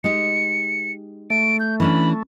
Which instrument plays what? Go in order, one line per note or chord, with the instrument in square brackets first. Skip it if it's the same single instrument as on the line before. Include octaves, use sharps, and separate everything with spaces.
[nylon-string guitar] G#3 D#4 G4 [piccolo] C#7
[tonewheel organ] A3 [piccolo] D7
[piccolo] G6
[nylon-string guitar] E3 C#4 D4 [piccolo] B5